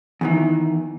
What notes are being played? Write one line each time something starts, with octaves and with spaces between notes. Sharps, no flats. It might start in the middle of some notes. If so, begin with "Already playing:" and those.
E2 D#3 E3